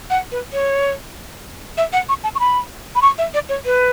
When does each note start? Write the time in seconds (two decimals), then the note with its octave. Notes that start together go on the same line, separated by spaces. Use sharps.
0.10 F#5
0.31 B4
0.53 C#5
1.77 E5
1.93 F#5
2.09 C#6
2.24 A5
2.35 C#6
2.40 B5
2.95 B5
3.02 C#6
3.18 E5
3.34 D5
3.49 C#5
3.65 B4